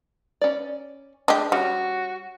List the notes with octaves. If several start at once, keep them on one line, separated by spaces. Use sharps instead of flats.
C#4 D5
A3 D4 G4 G#4 D#5
G3 C#4 F#4